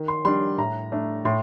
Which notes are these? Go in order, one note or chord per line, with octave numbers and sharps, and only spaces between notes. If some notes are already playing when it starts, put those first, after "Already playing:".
Already playing: D#3
C6
G3 D4 C6
A2 A#5
A3 D4
A2 C6